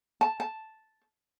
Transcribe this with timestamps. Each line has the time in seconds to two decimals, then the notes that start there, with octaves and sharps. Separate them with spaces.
0.21 A5
0.40 A5